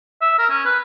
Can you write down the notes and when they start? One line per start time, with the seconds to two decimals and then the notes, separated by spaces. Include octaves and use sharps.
0.21 E5
0.38 A#4
0.50 C#4
0.65 B4